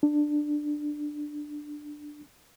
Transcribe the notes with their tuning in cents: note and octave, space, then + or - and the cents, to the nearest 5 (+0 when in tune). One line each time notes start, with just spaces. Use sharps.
D4 +10